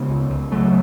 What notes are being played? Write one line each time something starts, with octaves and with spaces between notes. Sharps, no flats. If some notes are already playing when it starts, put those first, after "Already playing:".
Already playing: C#3 G#3 B3
C#2
C#2
C#3 F#3 A3